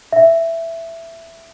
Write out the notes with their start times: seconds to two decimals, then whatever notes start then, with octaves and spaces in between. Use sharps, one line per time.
0.12 E5